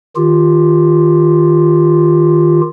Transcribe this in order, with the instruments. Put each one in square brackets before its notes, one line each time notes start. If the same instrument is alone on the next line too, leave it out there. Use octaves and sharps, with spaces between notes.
[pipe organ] D#3 F4 G4